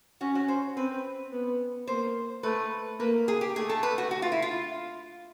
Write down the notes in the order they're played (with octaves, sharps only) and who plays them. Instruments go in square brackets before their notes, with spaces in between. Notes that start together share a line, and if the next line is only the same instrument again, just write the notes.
[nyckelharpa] C#4 [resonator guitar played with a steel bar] F#4
[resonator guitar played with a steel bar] F#4
C5
[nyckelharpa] C4 [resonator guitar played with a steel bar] B4
[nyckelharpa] B3
[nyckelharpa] A#3 [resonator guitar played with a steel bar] C5
[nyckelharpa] A3 [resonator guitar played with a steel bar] B4
[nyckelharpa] A#3 [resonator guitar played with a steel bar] B4
[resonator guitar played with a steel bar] G#4
G4
[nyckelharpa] A3 [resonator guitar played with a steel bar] G#4
[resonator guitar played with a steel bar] A4
B4
F#4
F#4
F4
E4
F4